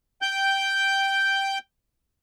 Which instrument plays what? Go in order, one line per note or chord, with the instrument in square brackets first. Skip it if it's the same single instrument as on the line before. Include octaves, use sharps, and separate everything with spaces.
[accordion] G5 G6